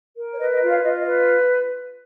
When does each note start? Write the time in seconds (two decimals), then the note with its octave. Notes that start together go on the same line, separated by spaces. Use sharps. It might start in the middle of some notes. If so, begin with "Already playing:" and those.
0.16 A#4
0.32 C#5
0.39 B4 D#5
0.53 D#5
0.61 F4
0.68 C#5 F5
0.82 F4 D#5
0.98 D#5
1.05 B4